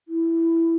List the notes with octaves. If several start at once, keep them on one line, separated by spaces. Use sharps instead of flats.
E4